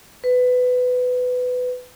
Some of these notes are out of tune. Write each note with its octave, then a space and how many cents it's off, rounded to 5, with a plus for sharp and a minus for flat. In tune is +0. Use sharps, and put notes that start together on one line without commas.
B4 +20